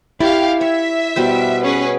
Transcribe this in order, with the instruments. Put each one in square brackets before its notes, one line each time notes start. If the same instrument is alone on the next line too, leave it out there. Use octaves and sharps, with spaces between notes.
[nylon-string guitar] E4 [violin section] G4 F5 [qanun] D5
[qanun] C#5 [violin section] E5
[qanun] B2 G3 C5
[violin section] C#4 G#4 B4